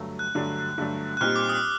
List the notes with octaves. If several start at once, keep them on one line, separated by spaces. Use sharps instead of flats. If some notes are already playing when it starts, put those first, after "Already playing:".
Already playing: G2 D3 F#3 A3
F#6
G2 D3 F#3 A3 D4
G2 D3 F#3 A3 D4
F#6
A#2 G3 C4 D#4 G4 F6
D6
D#6